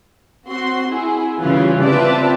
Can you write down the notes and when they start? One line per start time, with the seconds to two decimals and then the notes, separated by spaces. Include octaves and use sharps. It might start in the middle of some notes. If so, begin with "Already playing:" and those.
0.47 C4 F#4 C6
0.88 E4 G#4
1.42 C#3 E3 G3 F4
1.83 C4 F4 B4 D5 E5 A5